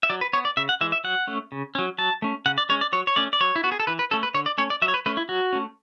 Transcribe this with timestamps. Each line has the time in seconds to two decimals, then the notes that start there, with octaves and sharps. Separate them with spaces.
0.03 E5
0.10 F#3 D5
0.21 B4
0.33 B3 C#5
0.45 D5
0.57 C#3 E5
0.69 F#5
0.81 E3 G#3 E5
0.92 E5
1.04 F#3 F#5
1.27 A3 C#4
1.52 C#3
1.75 F#3 C#4
1.98 F#3 A5
2.22 A3 C#4
2.46 C#3 F#5
2.58 D5
2.69 G#3 C#4 C#5
2.81 D5
2.93 F#3 C#5
3.07 C#5
3.16 A3 C#4 D5
3.33 D5
3.41 F#3 C#5
3.56 E4
3.63 B3 F#4
3.72 G#4
3.80 A4
3.87 E3 B4
3.99 B4
4.11 A3 C#4 A4
4.23 B4
4.34 D3 C#5
4.46 D5
4.58 A3 C#4 C#5
4.70 D5
4.82 F#3 E5
4.88 C#5
4.94 B4
5.06 A3 C#4 B4
5.17 E4
5.29 F#3 F#4
5.53 A3 C#4